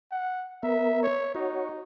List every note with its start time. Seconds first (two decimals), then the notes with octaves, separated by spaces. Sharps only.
0.11 F#5
0.63 B3 A#4 E5
1.03 C#5
1.35 D#4 F#4 C#5